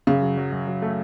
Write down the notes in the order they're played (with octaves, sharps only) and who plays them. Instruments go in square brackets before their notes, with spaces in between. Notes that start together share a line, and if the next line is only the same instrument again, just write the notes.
[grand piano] F#2 [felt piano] C#3
[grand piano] F#3
F#3
F#2
F#3
A3